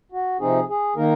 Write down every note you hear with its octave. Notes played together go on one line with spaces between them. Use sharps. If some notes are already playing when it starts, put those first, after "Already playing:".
F#4
C3 F3 C4 D#4 G#4
G#4
D#3 A#3 D#4 A#4